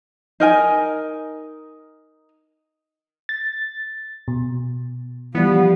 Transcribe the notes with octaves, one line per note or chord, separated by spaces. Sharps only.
D#4 A#4 G#5
A6
B2
E3 F3 G3 B3